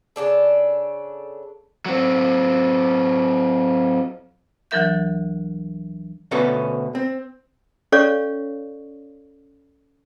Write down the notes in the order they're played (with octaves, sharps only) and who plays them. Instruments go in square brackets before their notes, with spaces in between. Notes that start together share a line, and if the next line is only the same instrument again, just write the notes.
[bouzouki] C#3 E3 D4 A4
[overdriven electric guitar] F#3 C4
[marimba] D2 E3 F#3 A#4 E5 G6
[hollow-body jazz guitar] D2 B2 B3 C#4 F#4 A4
C4
[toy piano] C#4 A4 C#5 D5 F5 C#6